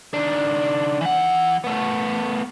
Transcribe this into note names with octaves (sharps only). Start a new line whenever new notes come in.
D#3 D4
E3 F#5
A3 B3